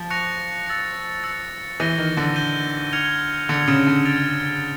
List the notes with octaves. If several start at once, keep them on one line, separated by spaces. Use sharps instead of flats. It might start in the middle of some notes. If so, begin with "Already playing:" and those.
Already playing: F3
C#6 F#6 A#6 C#7 F7
E6 A6 C#7
E6 A6 C#7
E3 G6 A#6 D#7 G7
D#3
D3
G6 A#6 D#7 G7
F6 G#6 C#7 F7
D3 F6 G#6 C#7 F7
C#3
D3
F6 A6 D7 F7